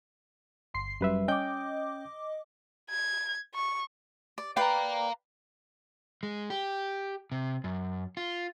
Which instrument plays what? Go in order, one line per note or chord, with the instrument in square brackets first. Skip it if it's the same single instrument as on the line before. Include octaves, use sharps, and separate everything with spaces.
[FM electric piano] G1 C6 C7
[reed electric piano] F#2 B4 E5 [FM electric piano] G3
[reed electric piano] C#4 G5 G6 [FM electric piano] D#5 D6
[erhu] G#6
C#6
[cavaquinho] D5
[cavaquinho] B4 D5 G5 [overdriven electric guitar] F5 A#5
[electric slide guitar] G#3
G4
C3
F#2
F4